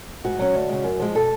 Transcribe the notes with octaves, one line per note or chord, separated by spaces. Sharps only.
G#2 F#4
F#3 C#4
D2
C#3 G#3
F#2
F3 G#3
B2 A4